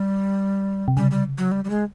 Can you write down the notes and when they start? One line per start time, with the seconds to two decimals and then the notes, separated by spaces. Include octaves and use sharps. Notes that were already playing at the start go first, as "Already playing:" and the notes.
Already playing: G3
0.88 C3
0.97 C#3 G3
1.11 G3
1.38 F#3
1.52 G3
1.65 G3
1.70 G#3